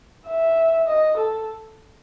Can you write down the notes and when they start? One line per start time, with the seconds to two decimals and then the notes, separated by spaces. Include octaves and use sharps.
0.28 E5
0.87 D#5
1.17 A4